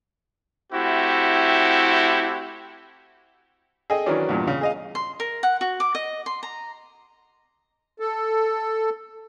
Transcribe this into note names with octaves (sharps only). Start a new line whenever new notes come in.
A3 C4 E4 F#4 G4
G#4 A4 D#5 G5
D#3 E3 F#3 C#4 D4
E2 G2 A#2
C#3
G#4 D#5 F5
C6
A#4
F#5
F#4
D6
D#5
C6
A#5
A4